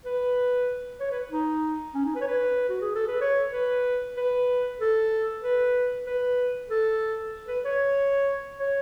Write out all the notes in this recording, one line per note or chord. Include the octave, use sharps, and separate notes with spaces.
B4
C#5
B4
D#4
C#4
D#4
B4
C#5
B4
F#4
G#4
A4
B4
C#5
B4
B4
A4
B4
B4
A4
B4
C#5
C#5